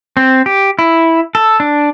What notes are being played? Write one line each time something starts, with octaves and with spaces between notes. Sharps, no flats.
C4
G4
E4
A4
D4